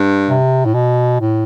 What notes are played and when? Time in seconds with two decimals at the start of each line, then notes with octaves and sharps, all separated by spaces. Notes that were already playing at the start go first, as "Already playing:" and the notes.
Already playing: G2
0.29 C3
0.66 A2
0.74 B2
1.21 A2